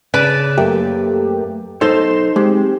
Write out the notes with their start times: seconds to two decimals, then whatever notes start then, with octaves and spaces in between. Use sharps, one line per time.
0.14 C#3 B4 D5 A5
0.58 F#2 A3 A#3 G4
1.81 B1 D#4 A4 C5 C6 E7
2.36 G#3 C4 G4